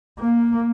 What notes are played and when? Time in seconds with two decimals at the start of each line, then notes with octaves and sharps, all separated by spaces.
0.20 A#3